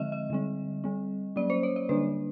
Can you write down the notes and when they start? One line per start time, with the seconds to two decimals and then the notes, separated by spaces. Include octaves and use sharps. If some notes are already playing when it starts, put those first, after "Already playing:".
Already playing: D3 F3 G#3 C4 D#5 E5
0.12 D#5
0.30 D3 G3 C4
0.84 G3 C4
1.36 F#3 A#3 C#4 D5
1.50 C5
1.63 C#5
1.76 D5
1.89 D3 G3 A#3 D4 B4